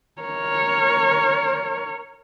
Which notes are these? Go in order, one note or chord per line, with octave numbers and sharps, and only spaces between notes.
A#4 C#5